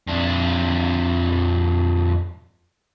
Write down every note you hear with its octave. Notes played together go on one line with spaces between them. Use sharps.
F2 D4